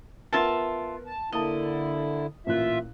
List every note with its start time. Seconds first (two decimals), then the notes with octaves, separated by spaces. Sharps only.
0.33 B3 F4 A#4 E5 F#5 A5
1.06 A5
1.32 D3 A#3 E4 D#5 A5
2.47 A1 A#2 F4 E5 F#6